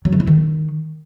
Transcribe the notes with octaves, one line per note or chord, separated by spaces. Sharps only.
F#3
C#3
E4
D#3